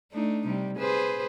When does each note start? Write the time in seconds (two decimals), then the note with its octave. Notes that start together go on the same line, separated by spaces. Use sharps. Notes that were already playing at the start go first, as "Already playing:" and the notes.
0.12 A3 D4 D#4
0.46 C3 G3
0.78 G#4 B4 C5